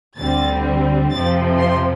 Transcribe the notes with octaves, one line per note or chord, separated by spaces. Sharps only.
D2 D3 G3 C4 A6
F2 C3 F3 C4 A6
C6